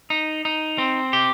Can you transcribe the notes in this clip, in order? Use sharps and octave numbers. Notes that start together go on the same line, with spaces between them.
D#4
D#4
C4
G4